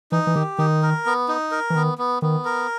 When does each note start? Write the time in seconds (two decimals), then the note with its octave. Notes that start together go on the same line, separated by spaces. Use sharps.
0.12 E3 D#4
0.27 E3
0.35 D#3 G4
0.58 D#3 D#4
0.83 A#4
1.06 B3
1.28 D#4
1.51 A#4
1.70 E3
1.75 D#3 B3
1.98 B3
2.22 D#3 B3
2.45 A#4